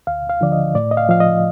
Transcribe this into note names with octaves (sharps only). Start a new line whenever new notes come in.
D2 F5
F5
D3 F3 D5
D#5
A2 D5
D#5
F5
F3 F5
D#5